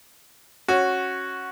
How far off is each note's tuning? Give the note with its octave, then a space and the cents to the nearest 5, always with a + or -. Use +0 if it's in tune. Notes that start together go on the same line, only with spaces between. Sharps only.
C#4 -10 F#4 +0